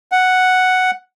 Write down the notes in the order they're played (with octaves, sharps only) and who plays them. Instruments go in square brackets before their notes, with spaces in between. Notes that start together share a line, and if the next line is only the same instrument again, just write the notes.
[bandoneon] F#5